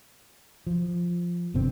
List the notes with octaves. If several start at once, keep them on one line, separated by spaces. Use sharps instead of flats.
F3
F#1 B2 D3 C4